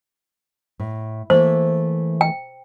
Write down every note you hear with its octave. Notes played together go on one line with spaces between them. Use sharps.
A2
E3 A3 A#3 C5
G5